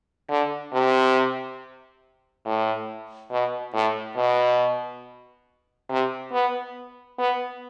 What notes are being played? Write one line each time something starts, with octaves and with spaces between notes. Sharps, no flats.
D3
C3
A2
B2
A2
B2
C3
B3
B3